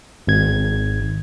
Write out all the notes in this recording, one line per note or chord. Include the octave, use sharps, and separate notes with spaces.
G#1 G#6